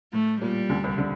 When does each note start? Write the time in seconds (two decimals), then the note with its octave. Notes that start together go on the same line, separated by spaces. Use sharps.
0.13 A2 A3
0.41 A#2 G3
0.70 D2 D3
0.84 C2 C3
0.98 D3